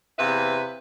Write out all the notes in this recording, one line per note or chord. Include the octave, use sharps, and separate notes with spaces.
E2 C3 B4 E5 F5